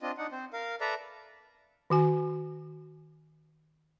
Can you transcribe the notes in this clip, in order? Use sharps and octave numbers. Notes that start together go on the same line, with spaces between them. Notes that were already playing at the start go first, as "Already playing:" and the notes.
C4 D4 F4 D#5
D4 D#4 F#5
C4 C5
A#4 F5
A4 B4 D5 E5 A#5
D#3 F#4 G#5